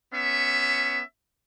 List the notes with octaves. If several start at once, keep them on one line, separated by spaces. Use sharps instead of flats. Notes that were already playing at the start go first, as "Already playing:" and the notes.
B3 C#4 E5